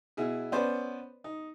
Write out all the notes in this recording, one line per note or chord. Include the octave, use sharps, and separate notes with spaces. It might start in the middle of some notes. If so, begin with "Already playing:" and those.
B2 E4 G#4
B3 C#4 B4 C5 D5
D#4